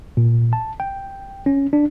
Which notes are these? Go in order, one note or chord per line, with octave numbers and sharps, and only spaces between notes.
A#2
A5
G5
C#4
D4